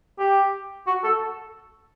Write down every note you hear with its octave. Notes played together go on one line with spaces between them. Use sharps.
G4
F#4
A4